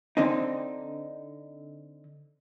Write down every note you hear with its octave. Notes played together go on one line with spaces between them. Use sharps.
D3 C4 D#4